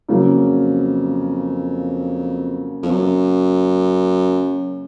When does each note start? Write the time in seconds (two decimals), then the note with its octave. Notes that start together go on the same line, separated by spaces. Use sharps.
0.09 F2 C#3 F#3 A#3
2.83 F2
2.90 F#2